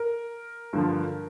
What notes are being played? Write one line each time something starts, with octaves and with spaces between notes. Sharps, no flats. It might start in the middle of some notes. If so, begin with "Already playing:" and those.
Already playing: A#4
G2 D3 F3